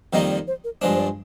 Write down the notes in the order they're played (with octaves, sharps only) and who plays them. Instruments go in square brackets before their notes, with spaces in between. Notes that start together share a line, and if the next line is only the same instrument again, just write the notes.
[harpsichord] F2 D#3 G3 A#3 D#4 [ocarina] D#5
[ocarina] D5
C5
A#4
[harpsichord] G2 F3 G#3 D4 [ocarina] C5
[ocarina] C5
D5